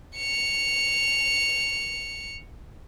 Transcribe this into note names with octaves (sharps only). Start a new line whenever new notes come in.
C#7 F7